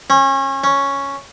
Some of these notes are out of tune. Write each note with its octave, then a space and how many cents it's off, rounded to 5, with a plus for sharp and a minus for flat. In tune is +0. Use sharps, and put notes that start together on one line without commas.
C#4 -30
C#4 +0